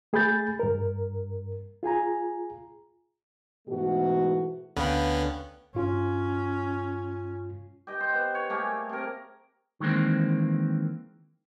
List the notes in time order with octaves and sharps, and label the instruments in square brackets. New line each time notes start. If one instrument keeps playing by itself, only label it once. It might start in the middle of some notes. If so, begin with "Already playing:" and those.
[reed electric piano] A3 G#4 G#5 B5 G6 A6
G2 A#4
F4 G#4 G#5 A#5
[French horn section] G#2 B2 E3 A3 F#4
[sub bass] D2 [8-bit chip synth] D3 B3 C#4 [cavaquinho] B4 F5 G5
[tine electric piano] G2 F4 [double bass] C#4
[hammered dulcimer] G4 D#5 G5
C5
B3
C#5
A3 A#3 G4 G#4
C3 A#4
[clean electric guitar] D#3 E3 G#3 A#3 C4